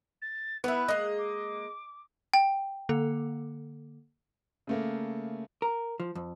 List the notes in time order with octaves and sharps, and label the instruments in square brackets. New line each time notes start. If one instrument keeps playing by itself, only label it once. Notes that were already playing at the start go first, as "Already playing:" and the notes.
[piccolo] A6
[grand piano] B3 [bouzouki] E4 B4 [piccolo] F#6
[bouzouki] G#3 A#3 [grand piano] D#5
[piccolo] D6
[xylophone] G5
[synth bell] D3 A#3 A4
[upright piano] C#3 A3 A#3
[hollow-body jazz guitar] A#4
F3
F2